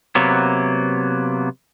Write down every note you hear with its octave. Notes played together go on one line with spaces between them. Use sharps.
C3 F#3 A#3 B3